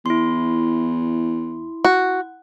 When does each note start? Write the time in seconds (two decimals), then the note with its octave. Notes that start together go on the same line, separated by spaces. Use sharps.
0.06 E2 E4 C6
1.85 F#4